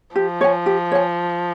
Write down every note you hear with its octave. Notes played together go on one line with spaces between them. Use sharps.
F3 G4
C#5 G#5
G4
C#5 G#5